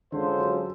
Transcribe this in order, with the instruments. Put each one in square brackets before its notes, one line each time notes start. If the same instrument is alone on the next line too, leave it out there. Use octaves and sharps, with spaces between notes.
[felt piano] D3 [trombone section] G#3 C#4 F4 A4 C5
[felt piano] F#3